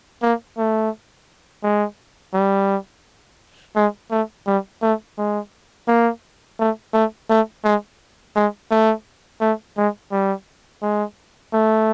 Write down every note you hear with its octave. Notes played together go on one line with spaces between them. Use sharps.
A#3
A3
G#3
G3
G#3
A3
G3
A3
G#3
A#3
A3
A3
A3
G#3
G#3
A3
A3
G#3
G3
G#3
A3